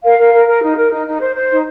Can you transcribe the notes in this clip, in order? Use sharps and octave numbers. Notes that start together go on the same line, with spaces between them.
A#4 F5
A#4
A#4
A#4
D#4
A#4
D#4
D#4
C5
C5
D#4